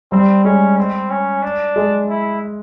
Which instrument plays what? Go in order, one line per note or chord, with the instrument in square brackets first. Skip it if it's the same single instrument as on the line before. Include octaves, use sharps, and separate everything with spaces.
[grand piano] G3 [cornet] C4
[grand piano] G#3 [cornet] C#4
[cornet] C4
C#4
D4
[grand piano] G#3
[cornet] E4